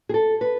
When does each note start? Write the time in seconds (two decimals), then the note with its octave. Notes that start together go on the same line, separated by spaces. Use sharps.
0.09 G#4
0.14 A4
0.41 B4